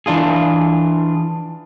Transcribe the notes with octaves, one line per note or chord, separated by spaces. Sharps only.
E3 D4 F4 G#4